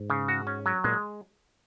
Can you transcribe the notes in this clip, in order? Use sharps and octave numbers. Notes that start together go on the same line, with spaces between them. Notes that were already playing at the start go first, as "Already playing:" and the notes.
Already playing: G#2
C#3
F#4
C#4
F#3
A#2 G#3